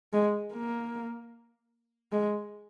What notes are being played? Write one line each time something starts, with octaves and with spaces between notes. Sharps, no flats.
G#3
A#3
G#3